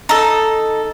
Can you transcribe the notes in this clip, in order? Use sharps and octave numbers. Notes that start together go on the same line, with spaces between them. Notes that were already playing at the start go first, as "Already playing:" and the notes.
D#4 A4